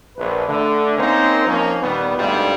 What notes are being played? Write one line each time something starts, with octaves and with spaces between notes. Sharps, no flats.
A#1 B4
D3 A3
A#3 C4 C#4 D#4 A#4 C5
F3 A#3 C4 C#4 D#4
A#2 D#3 G3 B3
G#1 D2 G2 G3 D#4 F4